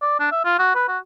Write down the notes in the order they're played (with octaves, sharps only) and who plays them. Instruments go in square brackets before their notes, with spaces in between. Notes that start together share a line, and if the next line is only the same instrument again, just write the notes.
[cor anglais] D5
D4
E5
F4
F#4
B4
F#4